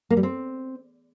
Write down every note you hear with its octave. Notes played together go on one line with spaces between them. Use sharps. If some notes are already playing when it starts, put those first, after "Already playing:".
A#3
G3
C4